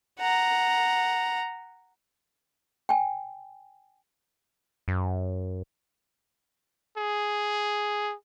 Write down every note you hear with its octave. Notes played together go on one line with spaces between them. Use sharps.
F#5 A#5
G5 G#5
F#2
G#4